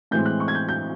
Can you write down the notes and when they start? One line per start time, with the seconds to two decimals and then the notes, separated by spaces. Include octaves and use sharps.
0.11 A2 E3 G#3 C4 G6
0.26 F#6
0.40 C#6
0.48 G#6
0.55 G6
0.68 G6